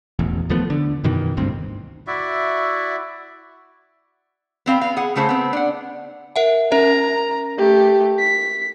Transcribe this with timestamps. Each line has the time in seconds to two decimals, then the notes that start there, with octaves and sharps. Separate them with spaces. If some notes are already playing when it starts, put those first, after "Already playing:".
0.19 E1 A1 E2
0.50 D#2 F3 A3 B3
0.70 D3
1.04 F#2 B2 D#3 E3
1.37 G#1 D2 G2 C4
2.07 E4 F#4 D5 E5
4.66 B3 C4 F5
4.81 B3 F5
4.97 G#4 F#5
5.16 C#3 A3 G#4 C5
5.29 B3 C4
5.53 D4 F#5
6.36 A#4 E5 F#5
6.72 C#4 A#4 E5 A#5
7.58 A3 G4
8.19 B6